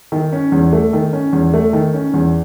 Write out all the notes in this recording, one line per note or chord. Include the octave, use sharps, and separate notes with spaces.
D#3
C#4
E2
A3
D#3
C#4
E2
A3
D#3
C#4
E2